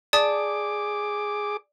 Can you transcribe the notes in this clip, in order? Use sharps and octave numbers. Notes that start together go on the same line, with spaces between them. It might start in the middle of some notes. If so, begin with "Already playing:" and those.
G#4 D5 A5 D6 D#6